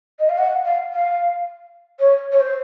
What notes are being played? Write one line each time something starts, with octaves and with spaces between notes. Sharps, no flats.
D#5
F5
F#5
F5
F5
C#5
C#5
C5